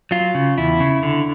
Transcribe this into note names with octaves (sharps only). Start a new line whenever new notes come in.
F#3 F4
C#3
E2 E4
C#3
D3